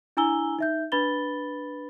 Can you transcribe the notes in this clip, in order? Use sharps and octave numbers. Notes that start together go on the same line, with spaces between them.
D4 E4 G#5 A#5 E6 G7
D#4 E5 G6
D4 B4 B5 A6 G7